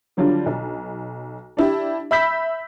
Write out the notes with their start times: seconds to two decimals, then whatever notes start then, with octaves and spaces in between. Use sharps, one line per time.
0.17 D3 F#3 G3 D4 F4
0.46 B1
1.57 D4 E4 G4
2.11 E5 B5 E6 G6 B6